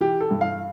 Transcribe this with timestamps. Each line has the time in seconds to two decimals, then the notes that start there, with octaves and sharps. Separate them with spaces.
0.01 E3 G4
0.21 A4
0.31 G2
0.41 F5